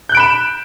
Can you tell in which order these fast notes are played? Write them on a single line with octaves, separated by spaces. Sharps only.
G6 F#6 D7 B5 E7